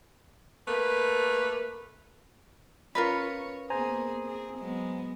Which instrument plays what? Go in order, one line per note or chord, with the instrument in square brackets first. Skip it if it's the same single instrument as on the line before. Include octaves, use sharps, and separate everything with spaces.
[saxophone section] A3 A#3 B4
[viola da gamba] C#4 C#5 [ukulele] F4 A#4 B4
[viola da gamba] A#3 B3 G#4 [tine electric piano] C5 G#5 A#5
[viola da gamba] C4 G#4
F#3 G#3 B3